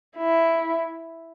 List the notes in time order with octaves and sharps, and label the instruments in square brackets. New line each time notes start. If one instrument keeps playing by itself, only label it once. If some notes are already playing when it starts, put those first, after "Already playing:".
[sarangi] E4